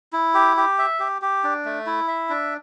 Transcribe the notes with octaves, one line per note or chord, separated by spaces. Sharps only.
E4
G4
G4
E5
G4
G4
D4
A3
E4
E5
D4